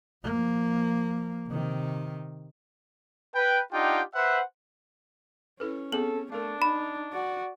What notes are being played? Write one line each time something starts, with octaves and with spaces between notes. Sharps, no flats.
F3 A#3
C3 D#3
B4 G5
D4 D#4 F4 G4 F#5 G5
B4 C5 E5 F#5
C#4 E4 A4 B4
B3 C4 G#4 A4 F#7
A3 D4 A#4 F5
D#4 B5
F#4 D5